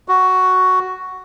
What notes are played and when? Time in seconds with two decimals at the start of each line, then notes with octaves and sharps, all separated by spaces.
0.08 F#4